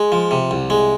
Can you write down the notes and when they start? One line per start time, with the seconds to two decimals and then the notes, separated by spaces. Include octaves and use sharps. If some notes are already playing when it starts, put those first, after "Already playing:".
Already playing: G#3
0.12 F3
0.31 C3
0.51 C2
0.70 G#3